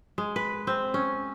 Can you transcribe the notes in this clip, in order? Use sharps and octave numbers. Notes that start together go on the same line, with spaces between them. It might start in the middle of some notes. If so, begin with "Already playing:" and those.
G#3
B4
C4
C#4